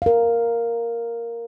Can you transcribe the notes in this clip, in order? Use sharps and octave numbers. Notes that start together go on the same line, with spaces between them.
A#4 F5